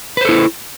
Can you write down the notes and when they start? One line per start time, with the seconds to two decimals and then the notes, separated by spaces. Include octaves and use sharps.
0.17 B4
0.21 C5
0.25 A4
0.29 E4